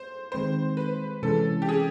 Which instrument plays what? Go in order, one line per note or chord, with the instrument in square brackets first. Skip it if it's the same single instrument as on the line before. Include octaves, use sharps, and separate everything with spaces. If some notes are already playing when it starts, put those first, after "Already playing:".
Already playing: [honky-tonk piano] C5
[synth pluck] D#3 G#3 C4 [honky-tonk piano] C5
[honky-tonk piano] B4
[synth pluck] C3 E3 G#3 C#4 [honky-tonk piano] A4
[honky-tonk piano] G4
G#4